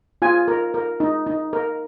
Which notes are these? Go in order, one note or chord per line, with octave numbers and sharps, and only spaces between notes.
F4 G#5
A#4
A#4
D#4
D#4
A#4